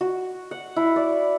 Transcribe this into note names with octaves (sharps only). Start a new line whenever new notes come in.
F#4
F#5
E4
D5